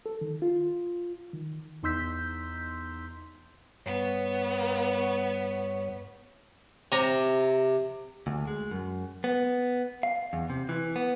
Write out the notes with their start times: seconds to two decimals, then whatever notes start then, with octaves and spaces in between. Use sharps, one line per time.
0.06 A4
0.21 D#3
0.42 F4
1.33 D#3
1.83 E2 D#4 C6 E6 G6 B6
3.86 G2 B3 C#5
6.92 C3 A#5
8.27 D2
8.47 G#3
8.71 F#2
9.24 B3
10.03 F5
10.33 E2
10.50 C3
10.69 E3
10.96 B3